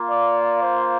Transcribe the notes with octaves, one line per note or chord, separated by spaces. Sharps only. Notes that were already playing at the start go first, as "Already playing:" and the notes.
Already playing: A#3 F4
D5
C5